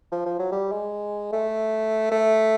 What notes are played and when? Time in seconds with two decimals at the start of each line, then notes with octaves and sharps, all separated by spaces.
0.12 F3
0.26 F3
0.39 F#3
0.52 G3
0.72 G#3
1.33 A3
2.12 A3